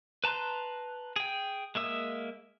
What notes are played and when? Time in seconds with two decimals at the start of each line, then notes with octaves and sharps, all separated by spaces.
0.24 B4 A5 A#5 C6 F#6
1.16 G#4 G5
1.75 G#3 A#3 E5 D#6